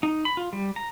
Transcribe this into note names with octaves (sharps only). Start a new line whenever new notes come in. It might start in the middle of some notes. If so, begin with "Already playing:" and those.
D#4
B5
F4
G3
A#5